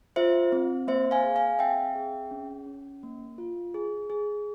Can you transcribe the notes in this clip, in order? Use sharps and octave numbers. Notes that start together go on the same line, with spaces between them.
F4 C5 E5
C4
A#3 C5 E5
F5 G#5
G#4
F5 G#5
C4 E5 G5
G#4
C#4
C#4
A#3
F4
G#4
G#4